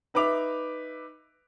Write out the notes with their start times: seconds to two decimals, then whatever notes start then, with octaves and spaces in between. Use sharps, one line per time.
0.14 D#4 B4 E5 D6 F7